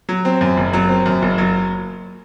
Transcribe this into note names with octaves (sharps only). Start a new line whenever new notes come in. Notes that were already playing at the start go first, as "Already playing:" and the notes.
F#3
C4
F#2
F#1
F#3
C4
F#2
F#1
F#3